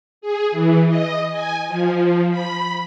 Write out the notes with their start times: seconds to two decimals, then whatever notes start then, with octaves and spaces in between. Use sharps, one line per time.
0.21 G#4
0.51 E3
0.89 D#5
1.32 G#5
1.68 F3
2.30 B5